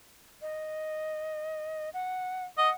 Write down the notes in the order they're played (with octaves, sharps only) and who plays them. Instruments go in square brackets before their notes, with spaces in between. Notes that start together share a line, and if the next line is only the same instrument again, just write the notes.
[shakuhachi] D#5
F#5
[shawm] D#5 [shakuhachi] F#5